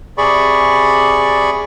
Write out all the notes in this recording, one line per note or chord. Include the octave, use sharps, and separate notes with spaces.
C3 G#4 D5 B5 C#6